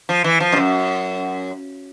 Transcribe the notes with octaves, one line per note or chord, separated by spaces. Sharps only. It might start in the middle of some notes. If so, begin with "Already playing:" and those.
F3
E3
F3
G2
F#2